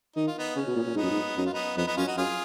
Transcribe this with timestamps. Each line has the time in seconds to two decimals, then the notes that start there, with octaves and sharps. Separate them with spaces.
0.16 D#3 D#4
0.27 F4
0.37 B3 D#4
0.56 C#3 C#4
0.67 B2
0.76 A#2
0.87 A#2
0.95 G#2 B3 D#4
1.03 F#2
1.10 G#2
1.37 F#2 D#4
1.46 F4
1.53 B3 D#4
1.77 F2 B3 D#4
1.87 B3 D#4
1.97 F#2 C#4 F4
2.07 D#4 F#4
2.17 F#2 F4 G#4